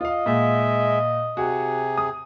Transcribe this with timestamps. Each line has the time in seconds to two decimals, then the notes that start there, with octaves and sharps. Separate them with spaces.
0.01 F4 D#5 F5
0.26 A#2 G#3 E5
1.37 C3 F#4 G#4
1.98 D#6